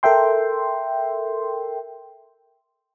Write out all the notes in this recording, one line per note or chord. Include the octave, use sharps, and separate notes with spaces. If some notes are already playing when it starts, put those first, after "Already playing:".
A4 A#4 E5 G5 C6